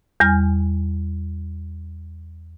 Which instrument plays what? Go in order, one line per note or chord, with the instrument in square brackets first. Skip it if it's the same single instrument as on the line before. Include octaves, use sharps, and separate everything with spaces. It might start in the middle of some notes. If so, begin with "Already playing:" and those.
[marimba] E2 G3 G#5 F6